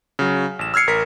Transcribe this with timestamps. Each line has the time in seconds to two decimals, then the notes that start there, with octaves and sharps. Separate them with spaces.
0.19 C#3 F#3
0.59 A1 E7
0.74 E6 F6 G#6 C7 C#7
0.87 A1 A#4 B6